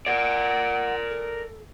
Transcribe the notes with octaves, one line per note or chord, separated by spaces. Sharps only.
A#4 D5 F#5
A4